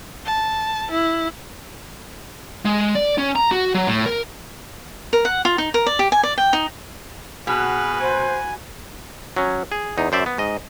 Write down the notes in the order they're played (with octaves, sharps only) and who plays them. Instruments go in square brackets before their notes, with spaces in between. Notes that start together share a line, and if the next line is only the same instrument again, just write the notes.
[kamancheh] A5
E4
[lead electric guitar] G#3
D5
C#4
A#5
F#4
F#3
A2
A#4
[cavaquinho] A#4
F#5
F4
D#4
A#4
D5
G4
G#5
D5
G5
D#4
[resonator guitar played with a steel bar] B2 [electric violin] F#4 B4 [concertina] G#4 F6
[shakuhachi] C5 [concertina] G#5
[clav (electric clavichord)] F#3 C#4
G#4
E2 D#4
F#2 C5 D5 E5
B3
G#2 D#5